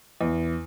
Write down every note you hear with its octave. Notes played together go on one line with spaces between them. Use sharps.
E2